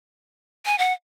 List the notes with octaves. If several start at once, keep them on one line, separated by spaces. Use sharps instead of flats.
G#5
F#5